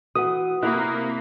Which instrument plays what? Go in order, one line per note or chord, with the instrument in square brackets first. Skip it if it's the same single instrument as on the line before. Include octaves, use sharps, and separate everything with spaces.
[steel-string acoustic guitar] E3 [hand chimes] F#4 F#5 [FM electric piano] D#6
[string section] C3 A#3 [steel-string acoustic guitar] E4 [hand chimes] F#6